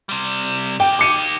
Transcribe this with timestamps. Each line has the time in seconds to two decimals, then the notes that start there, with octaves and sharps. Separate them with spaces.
0.09 C3 G3
0.80 D#3 G4 G5
0.99 D6 C#7 D#7